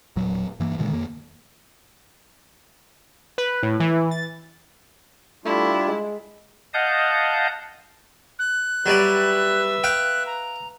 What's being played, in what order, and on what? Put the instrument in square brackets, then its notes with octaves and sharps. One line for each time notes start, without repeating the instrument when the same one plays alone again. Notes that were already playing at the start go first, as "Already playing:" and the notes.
[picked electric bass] E1 A#2 F#3
G2 E3 A#3
A#2 D3 D#3 G#3
F2 A#3
[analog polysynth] B4
A2
E3
A6
[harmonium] G3 D4 F4 [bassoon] A3 [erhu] E4
[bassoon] G#3
[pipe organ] D#5 F5 F#5 A5 D#6 G6
[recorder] F#6
[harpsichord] F#3 G3 D5 [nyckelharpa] B4 E5
[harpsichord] F5 G5 [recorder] F#6
[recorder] A#5